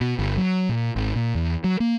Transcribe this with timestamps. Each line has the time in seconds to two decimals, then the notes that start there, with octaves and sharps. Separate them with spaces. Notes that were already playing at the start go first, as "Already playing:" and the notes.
0.01 B2
0.19 G1
0.37 F#3
0.69 A#2
0.96 G#1
1.16 A#2
1.35 E2
1.64 F#3
1.80 A#3